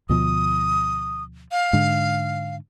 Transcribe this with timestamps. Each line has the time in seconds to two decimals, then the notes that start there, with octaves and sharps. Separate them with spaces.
0.09 D2 B2 F3 D#6
1.52 F5
1.73 G#2 D3